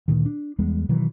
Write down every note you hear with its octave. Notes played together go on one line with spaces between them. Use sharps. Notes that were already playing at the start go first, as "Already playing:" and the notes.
D2 A#2 D#3
D4
E2 G3 G#3 B3
B2 D#3 E3 F#3